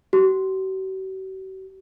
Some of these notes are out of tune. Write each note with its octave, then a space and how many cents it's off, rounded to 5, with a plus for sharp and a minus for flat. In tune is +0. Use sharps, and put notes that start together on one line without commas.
F#4 +45